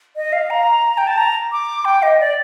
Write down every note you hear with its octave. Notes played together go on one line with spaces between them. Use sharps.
D#5
F5
A#5
G5
A5
A#5
D6
G5
D#5
D5